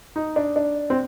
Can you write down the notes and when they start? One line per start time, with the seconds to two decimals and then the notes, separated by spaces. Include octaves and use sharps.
0.16 D#4
0.36 D4
0.56 D4
0.90 C4